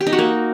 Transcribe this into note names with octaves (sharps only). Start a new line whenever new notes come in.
G4
D#4
F#4
A#3